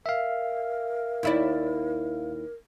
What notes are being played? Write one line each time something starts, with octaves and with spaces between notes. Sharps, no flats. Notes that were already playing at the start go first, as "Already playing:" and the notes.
A#4 E5 F5
D#2 E4 D5